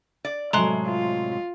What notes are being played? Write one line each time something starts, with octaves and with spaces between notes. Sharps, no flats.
D5
A2 C3 F#3 G#3 A#5 C6 F#6
F4